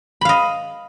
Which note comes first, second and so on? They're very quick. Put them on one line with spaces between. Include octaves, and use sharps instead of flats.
B5 F5 D#5